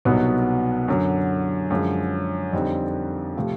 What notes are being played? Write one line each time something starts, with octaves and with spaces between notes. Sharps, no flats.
C2 B2 F#3 B3 D#4
F#2 D3 F#3
F#2 D3 F3 G#3
F2 D3 G3 C4 D#4
C3 F3 A3